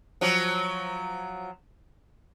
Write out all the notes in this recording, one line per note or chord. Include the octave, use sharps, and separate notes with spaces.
F3 F#3